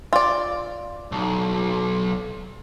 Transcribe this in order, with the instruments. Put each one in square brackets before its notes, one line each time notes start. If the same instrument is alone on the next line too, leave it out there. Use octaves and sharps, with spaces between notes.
[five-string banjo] F4 D5
[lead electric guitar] B1